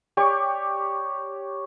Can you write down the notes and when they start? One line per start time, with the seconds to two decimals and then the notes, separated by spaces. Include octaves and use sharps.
0.17 G4 C#5 D5 C#6